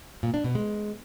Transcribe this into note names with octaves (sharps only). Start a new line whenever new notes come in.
A#2
D4
B2
G#3